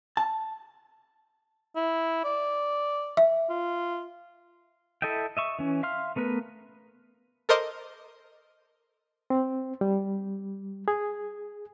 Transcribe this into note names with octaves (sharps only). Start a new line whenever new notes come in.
A5
E4
D5
E5
F4
E4 A4 D#5 E5 G5
D#5 E5 C#6
E3 C#4
E5 F5 C6 F6
A3 B3 A#4 B4
A4 A#4 C5 D#5 C6 D6
C4
G3
G#4